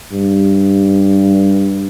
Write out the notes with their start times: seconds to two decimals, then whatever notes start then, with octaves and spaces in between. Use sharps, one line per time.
0.12 G2